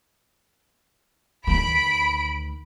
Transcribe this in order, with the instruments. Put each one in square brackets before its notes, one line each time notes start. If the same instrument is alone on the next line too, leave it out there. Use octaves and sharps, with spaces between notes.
[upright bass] D2 D#3 [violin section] B5 D7